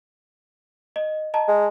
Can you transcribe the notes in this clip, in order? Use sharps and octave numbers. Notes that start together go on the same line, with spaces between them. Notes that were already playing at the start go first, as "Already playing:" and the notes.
D#5
D#5 A5 A#5
G#3